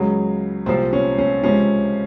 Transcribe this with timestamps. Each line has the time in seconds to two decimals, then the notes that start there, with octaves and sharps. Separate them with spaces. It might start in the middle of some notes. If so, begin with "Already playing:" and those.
Already playing: C#2 C#3 F#3
0.66 C2 A#2 F3 C4
0.93 C#4
1.18 C#4
1.43 C#2 C3 F3 C#4